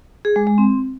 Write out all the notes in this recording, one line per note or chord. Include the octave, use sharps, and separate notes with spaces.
G#4
G#3
G#3
C4